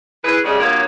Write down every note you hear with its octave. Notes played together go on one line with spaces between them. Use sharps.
E3 G#4 B4
C#3 G3 G#3
G2 A#2 F3 F#3 A#3 C#5